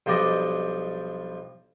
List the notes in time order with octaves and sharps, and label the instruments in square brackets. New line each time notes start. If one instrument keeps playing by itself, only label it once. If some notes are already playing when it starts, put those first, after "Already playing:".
[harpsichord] B1 F3 G3 D4 D5 D#5